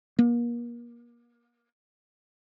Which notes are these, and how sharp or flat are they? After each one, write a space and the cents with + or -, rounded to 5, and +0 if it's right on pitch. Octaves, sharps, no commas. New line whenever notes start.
A#3 +35